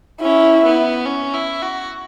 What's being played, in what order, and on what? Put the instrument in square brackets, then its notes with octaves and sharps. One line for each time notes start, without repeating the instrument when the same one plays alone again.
[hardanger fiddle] C#4 [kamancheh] E4
[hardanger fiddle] B3
C#4
E4
F#4